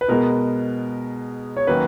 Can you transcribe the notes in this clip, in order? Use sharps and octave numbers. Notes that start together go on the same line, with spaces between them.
B4
B2 G#3 B3 A#4
C#5
D#3 F#3 A#3 C#4 B4